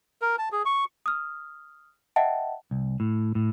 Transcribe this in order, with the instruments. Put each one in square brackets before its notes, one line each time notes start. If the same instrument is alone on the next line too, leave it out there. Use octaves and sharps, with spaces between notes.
[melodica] A#4
A5
G#4
C#6
[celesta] D#6 F6
D#5 E5 F#5 G5 A5
[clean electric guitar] C2
A2
A2